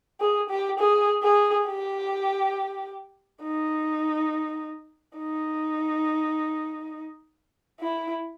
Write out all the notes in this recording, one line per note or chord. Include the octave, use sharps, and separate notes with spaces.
G#4
G4
G#4
G#4
G4
D#4
D#4
E4